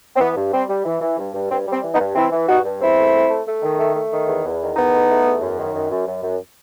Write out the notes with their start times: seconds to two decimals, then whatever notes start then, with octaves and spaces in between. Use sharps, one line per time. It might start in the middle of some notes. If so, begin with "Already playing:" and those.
0.16 C4
0.20 E3 B3
0.36 G2
0.53 G3 C4
0.69 G3
0.85 E3
1.01 E3
1.18 G2
1.34 G2
1.50 G2 C4
1.67 G3 C4
1.83 E3
1.94 B3 D#4
1.99 G2
2.15 E3 C4 E4
2.32 E3
2.48 G2 D#4 F#4
2.65 G2
2.81 E2 C4 E4
2.97 A3
3.13 A3
3.29 A3
3.47 A3
3.62 D#3
3.78 A3
3.95 A3
4.11 D#3
4.27 E2
4.44 E2
4.61 D#3
4.76 E2 B3 D#4
4.93 A3
5.09 A3
5.26 E2
5.41 F#2
5.58 D#3
5.74 F#2
5.91 F#2
6.07 F#2
6.23 F#2